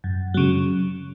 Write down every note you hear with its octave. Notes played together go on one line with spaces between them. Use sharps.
F#2
C#3 F#3